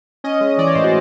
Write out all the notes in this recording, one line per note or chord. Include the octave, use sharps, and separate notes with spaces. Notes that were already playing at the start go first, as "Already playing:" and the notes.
C#4 D#5
G#3
E3 D5
C#5
A2 C5
F#4